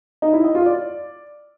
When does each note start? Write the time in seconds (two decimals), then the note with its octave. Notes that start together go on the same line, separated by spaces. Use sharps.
0.22 D#4
0.33 E4
0.44 D#5
0.55 F4
0.66 D5